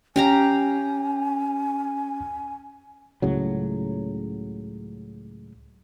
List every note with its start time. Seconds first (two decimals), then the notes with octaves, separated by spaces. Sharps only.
0.16 C#4 G4 F5 G#5 A#5
3.22 C#2 A2 C#3 F#3